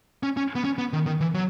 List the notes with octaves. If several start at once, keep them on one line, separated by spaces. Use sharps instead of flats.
C#4
C#4
B3
C#4
B3
D#3
D#3
E3
F#3